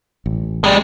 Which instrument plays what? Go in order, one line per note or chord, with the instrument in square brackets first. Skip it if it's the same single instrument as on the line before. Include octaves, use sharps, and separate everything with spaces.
[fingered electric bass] A1
[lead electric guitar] G3 G#3